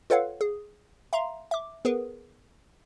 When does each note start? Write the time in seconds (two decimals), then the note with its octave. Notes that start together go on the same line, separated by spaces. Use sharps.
0.10 F4 A4 B4 C#5 F5 F#5
0.41 G#4
1.13 E5 F5 A#5 C6
1.51 E5 D6
1.85 B3 G#4 A#4 B4